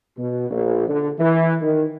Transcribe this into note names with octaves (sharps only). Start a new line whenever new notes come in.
B2
A#1
D3
E3
D#3